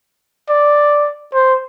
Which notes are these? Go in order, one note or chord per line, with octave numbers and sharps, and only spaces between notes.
D5
C5